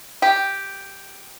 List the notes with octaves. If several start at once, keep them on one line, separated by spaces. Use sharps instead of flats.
G4